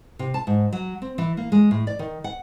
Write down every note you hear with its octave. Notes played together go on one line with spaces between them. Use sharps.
C3
A5
G#2
F#3
C4
E3
A#3
G#3
A2
D5
D#3
F#5